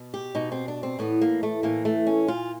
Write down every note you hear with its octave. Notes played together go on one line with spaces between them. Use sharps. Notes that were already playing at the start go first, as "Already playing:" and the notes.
Already playing: B2
G4
B2 D#4
C4
D4
C4
A2 E3 B3
A#3
A3
A2 E3 A#3
A3
C#4
A#2 F4